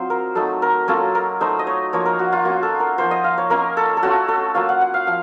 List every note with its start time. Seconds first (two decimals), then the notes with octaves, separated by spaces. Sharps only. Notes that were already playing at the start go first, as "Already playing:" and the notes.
Already playing: F#3 C4 D#4 F4 C5
0.10 A#4
0.35 F#3 A3 D#4 A4
0.62 A#4
0.88 F#3 A#3 C#4 F4 A4
1.15 A#4
1.40 A3 D#4 C5
1.59 D#5
1.67 C#5
1.93 F3 A#3 F4 C#5
2.06 A#4
2.19 F#4
2.32 F4
2.45 A#3 C#4 F4 F#4
2.63 A4
2.80 A#4
2.98 F3 A#3 F4 C5
3.11 D#5
3.24 F5
3.38 C#5
3.50 A#3 C#4 F4 A#4
3.77 A4
3.97 A4
4.03 A3 C#4 F4 F#4
4.28 A4
4.55 F#3 A#3 F4 F5
4.69 F#5
4.81 F#5
4.94 F5
5.07 F3 F5